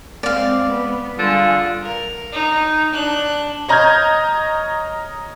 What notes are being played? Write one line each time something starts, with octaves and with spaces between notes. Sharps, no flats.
G#3 C4 D5 F5
B3
D3 G3 F4 G#4
A#4
D#4
D4 F#6
C#5 D#5 A#5 F6 G6 G#6